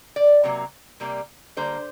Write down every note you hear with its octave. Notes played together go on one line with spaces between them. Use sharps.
D5
C3 F#3 A#3
C3 G3 A#3
D3 G3 A#3 C5